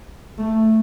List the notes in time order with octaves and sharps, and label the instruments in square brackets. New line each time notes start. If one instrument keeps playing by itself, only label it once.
[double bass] A3